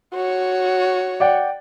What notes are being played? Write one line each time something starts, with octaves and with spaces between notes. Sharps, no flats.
F#4 C#5
D5 F#5 G5